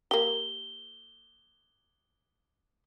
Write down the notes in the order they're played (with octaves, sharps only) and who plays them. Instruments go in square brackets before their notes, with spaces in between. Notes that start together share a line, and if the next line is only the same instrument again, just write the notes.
[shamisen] A#3 G4 [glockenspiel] G7